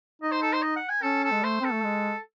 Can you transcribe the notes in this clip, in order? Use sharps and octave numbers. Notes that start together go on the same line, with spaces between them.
D#4 D#5
C5
A4
C5
D#5
F#5
G#5
C#4 A4
A4
G#3
A3 C5
C4 A4
A3
G#3